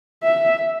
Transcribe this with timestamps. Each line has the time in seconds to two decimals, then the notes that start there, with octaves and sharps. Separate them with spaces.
0.23 E5